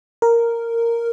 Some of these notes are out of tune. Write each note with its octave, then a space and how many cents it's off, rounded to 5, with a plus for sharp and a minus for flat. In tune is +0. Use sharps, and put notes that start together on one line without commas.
A#4 -5